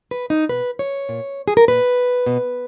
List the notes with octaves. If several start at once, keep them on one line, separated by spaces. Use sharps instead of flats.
B4
D#4
B2 B4
C#5
A#2
G#4
A#4
A#2 B4
B2